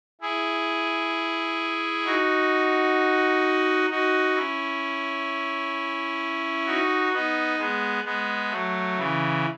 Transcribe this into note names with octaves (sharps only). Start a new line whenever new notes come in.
E4 G#4
D#4 F#4
D#4 F#4
C#4 E4
D#4 F#4
B3 D#4
G#3 B3
G#3 B3
F#3 A3
C#3 E3